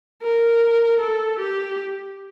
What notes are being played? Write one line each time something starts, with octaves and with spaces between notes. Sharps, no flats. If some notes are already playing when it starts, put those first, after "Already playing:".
A#4
A4
G4